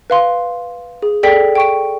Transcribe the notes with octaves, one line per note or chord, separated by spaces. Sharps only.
B4 F5 C6
G#4
G#4 A4 D5 G5 B6
G5 C#6 D7